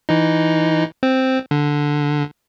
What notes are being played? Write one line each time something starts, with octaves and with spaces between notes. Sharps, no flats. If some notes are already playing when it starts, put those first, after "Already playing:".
E3 D#4
C4
D3